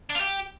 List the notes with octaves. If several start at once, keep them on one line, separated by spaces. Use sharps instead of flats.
D4
F4
G4